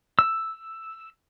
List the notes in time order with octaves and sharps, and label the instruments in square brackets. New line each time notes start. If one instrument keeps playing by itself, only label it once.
[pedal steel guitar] E6